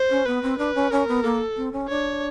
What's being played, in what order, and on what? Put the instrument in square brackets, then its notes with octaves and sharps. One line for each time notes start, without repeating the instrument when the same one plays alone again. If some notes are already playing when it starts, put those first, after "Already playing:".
Already playing: [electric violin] C5
[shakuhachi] C#4
[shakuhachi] B3 [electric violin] B4
[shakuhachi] C4
[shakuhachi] D4 [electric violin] B4
[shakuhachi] C#4
[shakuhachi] C#4 [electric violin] A#4
[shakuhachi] B3
[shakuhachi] A#3 [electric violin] A4
[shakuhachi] C4
C#4
[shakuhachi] D4 [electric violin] C#5